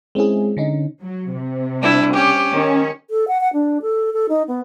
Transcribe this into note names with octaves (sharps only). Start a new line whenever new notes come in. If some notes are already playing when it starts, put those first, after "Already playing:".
G#3 C4 C#4 E4 G#4
D3 C#4 D#4
F#3
C3
G3 D4 E4
C#4 G4
D#3 C#4
A4
F#5
F#5
D4
A4
A4
D#4
B3